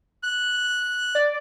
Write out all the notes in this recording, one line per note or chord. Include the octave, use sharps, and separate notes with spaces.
F#6
D5